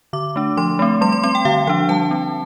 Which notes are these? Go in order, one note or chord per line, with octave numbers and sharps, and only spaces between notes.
D3 D6
A3 D4
F3 C6
A3 C4
G3 C6
C6
C4 C6
G5
D3 F5
F3 D4 G5
G3 A5
C4